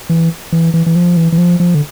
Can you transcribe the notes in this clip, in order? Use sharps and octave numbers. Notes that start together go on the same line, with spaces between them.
E3
E3
E3
E3
F3
E3
E3
F3
F3
D3